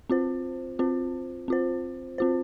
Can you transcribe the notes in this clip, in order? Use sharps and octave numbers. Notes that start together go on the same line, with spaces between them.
C4 F4 C5
C4 F4 C5
C4 F4 C5
C4 F4 C5